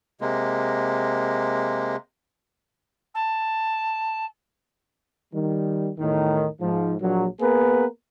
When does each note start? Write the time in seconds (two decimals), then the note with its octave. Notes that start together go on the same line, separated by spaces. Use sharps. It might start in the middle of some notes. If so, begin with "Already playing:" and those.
0.21 C3 G#3 A#3
3.14 A5
5.34 D#3 G3
5.99 E2 A2 D#3
6.61 G#2 F3
7.01 A#1 F#3
7.40 A#3 B3 G#4 A#4 B4